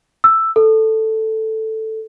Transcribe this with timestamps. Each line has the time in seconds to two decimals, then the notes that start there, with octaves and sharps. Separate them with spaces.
0.24 E6
0.56 A4